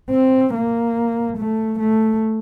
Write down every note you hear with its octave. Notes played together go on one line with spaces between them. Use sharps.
C4
A#3
A3
A3